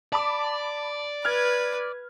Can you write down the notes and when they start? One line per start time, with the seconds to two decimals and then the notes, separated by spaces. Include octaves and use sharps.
0.12 D5 A5 B5 D6
1.25 B4 F6 G#6